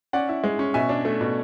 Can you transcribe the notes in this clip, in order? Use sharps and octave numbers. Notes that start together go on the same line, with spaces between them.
C#4 D5 F#5
E4
G#3
C#4
B2 E5 G#5
D4
A3
B2